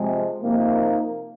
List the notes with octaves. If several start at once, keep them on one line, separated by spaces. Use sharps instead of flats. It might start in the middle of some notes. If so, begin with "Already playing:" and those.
Already playing: C3 F3 G#3
C3 F3 A#3 D#4